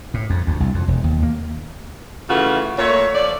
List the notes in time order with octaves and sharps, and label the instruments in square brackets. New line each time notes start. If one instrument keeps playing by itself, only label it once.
[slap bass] A2
F2
D2
C2
F2
E1
D#2
A#3
[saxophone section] C#3 E3 A3 F4 F#4
A#2 A3 C#5
F3 D5